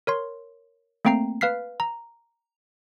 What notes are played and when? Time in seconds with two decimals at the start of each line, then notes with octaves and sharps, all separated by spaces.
0.07 A#4 C#5 C6
1.05 A3 A#3 C4 G5 A#5 C7
1.41 B4 F5 F6 B6 C7
1.80 A#5